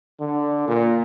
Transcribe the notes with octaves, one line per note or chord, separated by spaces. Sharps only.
D3
A#2